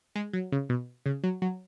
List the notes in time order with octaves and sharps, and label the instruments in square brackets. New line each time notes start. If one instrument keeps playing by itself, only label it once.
[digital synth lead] G#3
F#3
C#3
B2
C#3
F#3
F#3